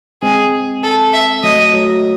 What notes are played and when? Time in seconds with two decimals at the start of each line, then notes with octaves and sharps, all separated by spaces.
0.23 G#3 C4 G#4
0.83 A4
1.13 E5
1.43 F#3 A3 D#5
1.73 F#3